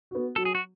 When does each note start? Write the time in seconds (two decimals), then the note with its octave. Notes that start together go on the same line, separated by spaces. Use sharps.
0.11 B3 F#4
0.36 F#3 A4
0.45 G#4
0.55 F#4